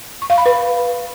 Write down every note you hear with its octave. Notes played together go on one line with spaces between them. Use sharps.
C#6
F5
B5
B4